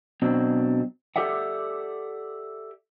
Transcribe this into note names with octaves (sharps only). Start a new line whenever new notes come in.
B2 F#3 C4 D4
G4 A4 D5 E5 F#5